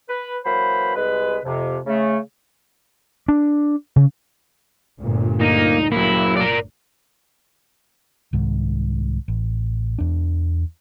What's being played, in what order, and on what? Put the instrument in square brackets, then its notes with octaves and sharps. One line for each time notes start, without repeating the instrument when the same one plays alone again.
[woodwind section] B4
E3 F#3 A#3 B4 C5 B5
C2 G#3 B4
F2 C3
C#3 A3
[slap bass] D4
C#3
[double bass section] G1 D2 A#2
[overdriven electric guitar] A#3 [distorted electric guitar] D#4
[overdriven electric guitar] F#3 A#3 [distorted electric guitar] E4
[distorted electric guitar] A#4 D5
[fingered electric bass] C2 G#2 D#3
A1
E2 D4